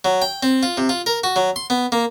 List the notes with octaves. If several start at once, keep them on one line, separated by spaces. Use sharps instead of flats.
F#3
G5
C4
F4
C3
F4
A#4
F#4
F#3
C6
B3
A#3